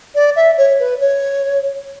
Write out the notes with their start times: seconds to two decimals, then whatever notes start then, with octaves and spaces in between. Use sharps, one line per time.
0.15 D5
0.36 E5
0.57 C#5
0.79 B4
1.00 C#5